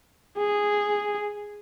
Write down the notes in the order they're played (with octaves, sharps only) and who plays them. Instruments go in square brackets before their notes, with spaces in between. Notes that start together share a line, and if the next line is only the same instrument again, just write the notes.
[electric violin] G#4